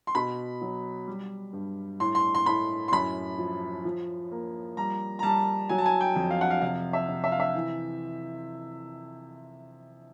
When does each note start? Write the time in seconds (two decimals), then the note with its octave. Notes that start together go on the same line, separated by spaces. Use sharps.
0.07 C6
0.15 B2 B5
0.61 F#3
1.07 G3
1.53 G2
2.00 A2 C6
2.15 C6
2.35 C6
2.46 A2 B5
2.88 C6
2.92 F#2 B5
3.38 F3
3.85 F3
4.32 A#3
4.77 G3 A#5
5.19 A#5
5.23 G3 A5
5.69 F#3 G#5
5.78 A5
5.86 G#5
6.01 G5
6.16 F2
6.31 F5
6.41 F#5
6.50 F5
6.61 C3 F5
6.93 E5
7.09 C3
7.24 E5
7.32 F5
7.40 E5
7.55 E3